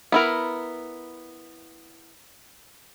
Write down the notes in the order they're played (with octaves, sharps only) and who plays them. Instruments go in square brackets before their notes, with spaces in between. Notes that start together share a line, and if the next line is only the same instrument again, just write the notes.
[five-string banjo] B3 E4 A#4